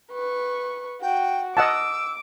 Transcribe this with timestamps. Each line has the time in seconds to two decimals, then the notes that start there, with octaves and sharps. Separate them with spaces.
0.11 B4 C#6
1.02 F#4 G5
1.57 D#5 F#5 A5 D6 E6